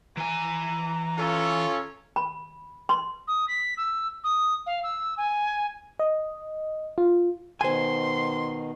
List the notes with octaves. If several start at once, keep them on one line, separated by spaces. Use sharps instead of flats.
E3 G#5 A#5
C#4 F4 A4
B5
C6
D#6
B6
E6
D#6
F5
E6
G#5
D#5
F4
B2 D#3 C5 G#5 C6